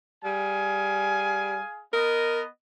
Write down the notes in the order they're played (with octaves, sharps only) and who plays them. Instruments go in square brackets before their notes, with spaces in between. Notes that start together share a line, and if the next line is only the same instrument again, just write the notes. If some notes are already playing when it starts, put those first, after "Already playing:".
[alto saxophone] G3 [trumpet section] G#4 F5 G#5
[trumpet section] B3 D#5 [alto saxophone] A#4